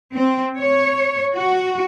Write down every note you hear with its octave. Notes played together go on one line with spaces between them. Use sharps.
C4
C#5
F#4